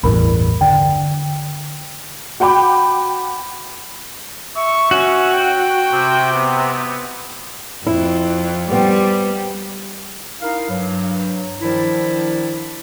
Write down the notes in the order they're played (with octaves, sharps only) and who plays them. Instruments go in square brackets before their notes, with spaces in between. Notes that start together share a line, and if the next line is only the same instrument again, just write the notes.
[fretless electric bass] A1 E2 G2 [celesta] A#4 B5
[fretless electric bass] D3 [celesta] G5
[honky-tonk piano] F#4 F#5 G5 B5 D6
[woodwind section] E5 [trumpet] C#6
[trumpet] C#4 [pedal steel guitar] F#4
[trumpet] G5
[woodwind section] C3
[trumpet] B3
[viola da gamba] F2 [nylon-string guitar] E4
[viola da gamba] G3 [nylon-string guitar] B3 C4
[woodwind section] D#4 E4 A#4 F5
G2 F#3
D#3 F3 G3 D4 E4